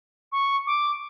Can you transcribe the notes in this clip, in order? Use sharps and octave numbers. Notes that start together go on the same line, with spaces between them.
C#6
D6